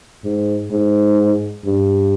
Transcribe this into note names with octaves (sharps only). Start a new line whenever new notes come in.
G#2
G#2
G2